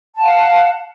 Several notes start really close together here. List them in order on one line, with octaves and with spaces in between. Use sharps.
A5 F#5 F5